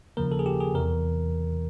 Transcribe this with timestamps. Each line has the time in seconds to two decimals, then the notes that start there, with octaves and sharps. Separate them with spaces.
0.17 D#2 C#3 F3 A#3 A#4
0.32 A4
0.39 G#4
0.46 G4
0.60 G#4
0.74 E2 C3 E3 A#4